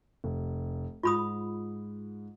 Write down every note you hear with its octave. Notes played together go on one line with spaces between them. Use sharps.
F1
G#2 F4 B5 D#6